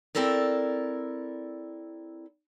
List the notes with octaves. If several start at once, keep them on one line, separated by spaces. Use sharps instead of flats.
C4 E4 A4 A#4 D5